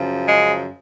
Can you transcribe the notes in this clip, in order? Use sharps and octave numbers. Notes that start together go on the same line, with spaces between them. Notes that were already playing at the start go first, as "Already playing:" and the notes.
Already playing: F#2 C#3 F3
G#3